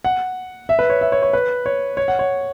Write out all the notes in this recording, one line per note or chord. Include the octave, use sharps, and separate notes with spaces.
F#5
E5
B4
C#5
E5
C#5
C#5
B4
C#5
C#5
F#5
C#5